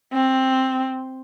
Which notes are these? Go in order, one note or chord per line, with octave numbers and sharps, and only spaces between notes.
C4